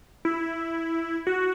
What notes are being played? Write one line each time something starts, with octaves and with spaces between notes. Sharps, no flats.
E4
F#4